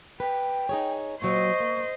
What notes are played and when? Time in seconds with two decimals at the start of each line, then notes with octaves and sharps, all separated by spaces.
0.20 B4 G5
0.69 D#4 G#4 C#5
1.22 A#2 F#3 C5 D#5 C#6
1.60 A#3